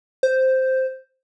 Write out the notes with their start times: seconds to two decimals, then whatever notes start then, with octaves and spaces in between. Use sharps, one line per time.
0.23 C5